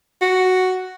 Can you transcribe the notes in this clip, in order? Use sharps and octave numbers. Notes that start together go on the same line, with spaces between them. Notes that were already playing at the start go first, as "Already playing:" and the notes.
F#4